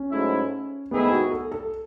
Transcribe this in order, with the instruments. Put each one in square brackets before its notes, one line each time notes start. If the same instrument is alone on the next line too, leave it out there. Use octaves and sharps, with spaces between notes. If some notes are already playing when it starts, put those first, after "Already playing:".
Already playing: [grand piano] C#4
[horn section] G#2 F#3 A3 E4
[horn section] G#2 D#3 A3 E4 G#4 [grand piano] B3
[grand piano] F#4
A4
A4